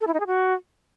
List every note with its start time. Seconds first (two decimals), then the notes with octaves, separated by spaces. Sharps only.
0.01 A4
0.07 E4
0.14 D#4
0.20 G#4
0.27 F#4